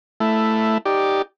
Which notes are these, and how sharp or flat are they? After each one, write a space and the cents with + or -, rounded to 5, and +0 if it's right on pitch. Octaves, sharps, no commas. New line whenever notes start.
A3 +0 E4 +5
D#4 +0 G4 +0 D5 +0